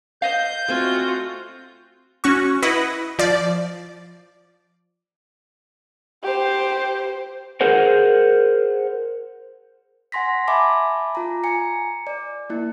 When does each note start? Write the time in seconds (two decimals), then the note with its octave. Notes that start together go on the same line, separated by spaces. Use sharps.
0.22 C5 D#5 F5 G6
0.68 A3 C4 F4 F#4 G#5
2.24 C#4 F#4 C#6
2.62 E4 B4 D#5 F#5
3.19 F3 D5
6.23 G4 C5
7.61 G#4 A#4 C5 F#5
10.12 F#5 G#5 C6 A#6 B6
10.48 E5 G#5 A5 B5 D6
11.15 F4 A#5
11.44 G#5 A#5 C#7
12.07 D5
12.50 A#3 E4